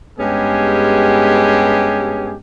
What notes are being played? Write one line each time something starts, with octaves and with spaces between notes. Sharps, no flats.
G2 G#3 B3 C#4 G4 G#4